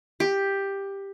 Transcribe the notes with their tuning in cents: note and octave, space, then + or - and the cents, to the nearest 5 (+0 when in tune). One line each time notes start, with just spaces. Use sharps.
G4 +10